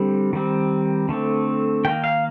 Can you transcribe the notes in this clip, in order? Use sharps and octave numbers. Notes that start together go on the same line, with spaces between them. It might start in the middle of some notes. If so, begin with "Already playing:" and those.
Already playing: D3 G3 C4
D#3 G3 C4
D3 A3 C4
D#3 A#3 G5
F5